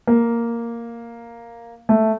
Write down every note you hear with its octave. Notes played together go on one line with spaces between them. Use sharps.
A#3
A3